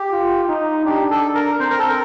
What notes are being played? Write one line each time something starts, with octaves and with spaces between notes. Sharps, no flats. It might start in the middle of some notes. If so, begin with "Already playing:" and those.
Already playing: G4
F4
D#4
D4 G4
A4
A#4
C4 C5
A#4
A4
A#4